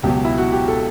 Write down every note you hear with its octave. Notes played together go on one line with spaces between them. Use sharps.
C#2 B2 F#3 G4
E4
F#4
G4
A4